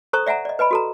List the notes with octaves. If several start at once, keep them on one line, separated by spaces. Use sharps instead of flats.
A4 C5 A#5 C#6 D#6
D5 E5 F#5 G#5 A#5
D5 D#5
B4 D#5 G#5 B5
F#4 A4 A#5